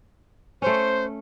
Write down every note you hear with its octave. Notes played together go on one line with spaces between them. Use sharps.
A3 C#4 C5